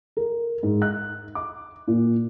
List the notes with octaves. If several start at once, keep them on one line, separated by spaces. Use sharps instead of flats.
A#4
G#2
F#6
D6
A#2